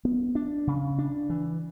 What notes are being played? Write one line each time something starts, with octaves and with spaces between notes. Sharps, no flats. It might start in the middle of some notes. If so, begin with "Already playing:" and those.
B3
D4
C#3
D4
E3